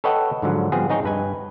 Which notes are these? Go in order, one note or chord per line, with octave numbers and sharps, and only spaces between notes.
A4 B4 C#5 D#5 F#5 G5
G#2 D3 F3 F#3
F3 G3 B3 C4 G#4
C4 D#4 G#4 C#5 G5
G2 B4 G#5